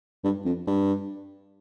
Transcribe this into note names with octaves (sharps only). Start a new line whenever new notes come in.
G2
F2
G2